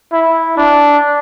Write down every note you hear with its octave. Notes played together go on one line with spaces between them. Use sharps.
E4
D4